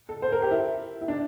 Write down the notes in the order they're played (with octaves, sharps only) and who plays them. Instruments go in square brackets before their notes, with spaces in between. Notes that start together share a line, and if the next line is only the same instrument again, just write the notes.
[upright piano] A4
C5
A#4
G4
E4
E4
D4